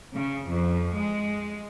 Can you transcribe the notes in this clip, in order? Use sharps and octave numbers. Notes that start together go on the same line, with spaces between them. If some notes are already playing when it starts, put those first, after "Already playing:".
C#3
F2
G#3